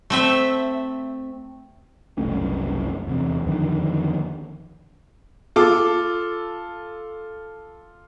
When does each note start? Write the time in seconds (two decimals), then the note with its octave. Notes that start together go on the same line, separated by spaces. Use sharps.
0.10 A3 C4 E5
2.18 F#1 C2 A3 C#4
3.07 E2 C3
3.46 F2 D3 D#3
5.56 F4 A4 D6